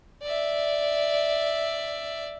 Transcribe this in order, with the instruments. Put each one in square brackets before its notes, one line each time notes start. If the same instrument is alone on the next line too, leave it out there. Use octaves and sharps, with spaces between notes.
[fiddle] D5 E5